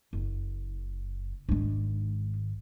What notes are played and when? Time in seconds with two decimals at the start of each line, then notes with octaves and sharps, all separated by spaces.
0.13 F#1
1.49 G#1 G#3 D4